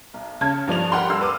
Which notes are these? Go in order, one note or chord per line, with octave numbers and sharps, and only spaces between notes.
B1
C#3 C#4 A5 G#6
G2 F3 D5 F7
G4 A#4 F#5 G5 B5 C6
G2 D5 E6 C7
B4 C6 D6 F6